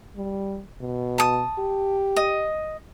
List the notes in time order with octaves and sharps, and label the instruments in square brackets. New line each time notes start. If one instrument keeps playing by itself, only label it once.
[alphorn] G3
B2
[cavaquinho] A5 D#6
[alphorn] G4
[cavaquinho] D#5